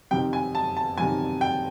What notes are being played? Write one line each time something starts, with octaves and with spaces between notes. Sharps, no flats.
F2 C3 D#3 G5
G#5
A5
A5
F2 C3 D#3 G#5
G5